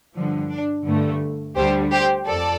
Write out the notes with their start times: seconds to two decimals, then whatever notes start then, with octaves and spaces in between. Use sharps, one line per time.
0.13 G2 D3 F3
0.49 D4
0.85 G2 D3 A3
1.56 D2 D3 G3 G4 C5
1.91 G4 C5
2.27 F2 A4 D5